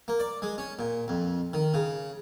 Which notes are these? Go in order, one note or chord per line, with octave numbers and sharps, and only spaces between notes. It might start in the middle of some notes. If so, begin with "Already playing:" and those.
A#3
D5
G#3
C#4
A#2
F2
D#3
C#3